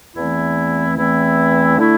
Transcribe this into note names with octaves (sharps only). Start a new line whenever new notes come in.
E2 E3 A3 C4 E4
E2 E3 A3 C4 E4
D3 A3 E4